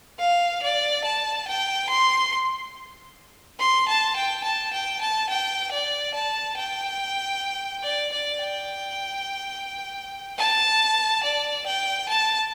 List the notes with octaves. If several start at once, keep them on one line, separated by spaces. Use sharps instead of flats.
F5
D5
A5
G5
C6
C6
A5
G5
A5
G5
A5
G5
D5
A5
G5
D5
D5
G5
A5
D5
G5
A5